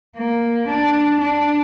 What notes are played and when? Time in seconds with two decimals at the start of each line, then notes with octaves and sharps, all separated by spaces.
0.17 A#3
0.68 D4
1.21 D4